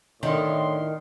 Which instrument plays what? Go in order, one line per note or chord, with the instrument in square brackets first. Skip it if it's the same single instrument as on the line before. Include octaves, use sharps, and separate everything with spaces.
[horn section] A2 D3 C6 [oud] D#3